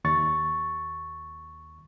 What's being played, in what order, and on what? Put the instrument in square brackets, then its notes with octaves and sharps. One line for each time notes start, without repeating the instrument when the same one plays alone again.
[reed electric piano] D#2 C#6 A6